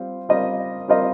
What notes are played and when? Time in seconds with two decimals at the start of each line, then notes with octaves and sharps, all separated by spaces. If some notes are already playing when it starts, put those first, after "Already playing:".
Already playing: G3 C4 F4
0.29 G3 C4 F4 A#4 D#5
0.88 G3 C4 F4 A#4 D#5